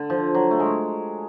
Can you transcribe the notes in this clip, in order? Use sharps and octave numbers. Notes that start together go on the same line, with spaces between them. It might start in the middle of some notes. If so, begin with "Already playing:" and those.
Already playing: D3
F3
F#3
A3
G#3